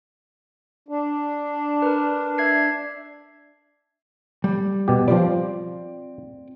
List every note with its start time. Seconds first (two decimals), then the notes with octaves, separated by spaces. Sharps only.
0.88 D4
1.82 A#4 B4
2.38 E5 G#6 C7
4.44 G3
4.88 B2 G4
5.08 F3 G3 C4 F4 D5